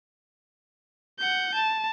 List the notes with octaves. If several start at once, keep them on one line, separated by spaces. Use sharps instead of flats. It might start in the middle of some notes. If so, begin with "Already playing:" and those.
F#5 G6
A5